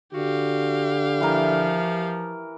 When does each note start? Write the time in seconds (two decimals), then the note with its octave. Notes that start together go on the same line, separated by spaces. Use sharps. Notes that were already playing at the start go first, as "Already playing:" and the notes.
0.14 D3 F#4 G4 F5
1.20 E3 F3 A#4